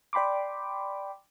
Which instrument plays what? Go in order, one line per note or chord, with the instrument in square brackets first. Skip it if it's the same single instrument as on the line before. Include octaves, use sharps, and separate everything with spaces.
[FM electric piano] D5 G5 B5 C6 D6